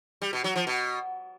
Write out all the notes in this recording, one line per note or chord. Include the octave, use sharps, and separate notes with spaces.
G3
B2
F#3
F3
B2